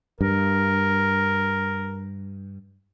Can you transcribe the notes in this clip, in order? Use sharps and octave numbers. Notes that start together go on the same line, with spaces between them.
G2 A#4